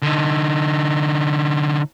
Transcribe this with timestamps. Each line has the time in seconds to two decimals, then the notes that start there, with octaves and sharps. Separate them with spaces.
0.02 D3 D#4